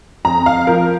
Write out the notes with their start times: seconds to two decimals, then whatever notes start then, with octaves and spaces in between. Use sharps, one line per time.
0.25 F2 A#5
0.46 F5
0.67 F3 A#4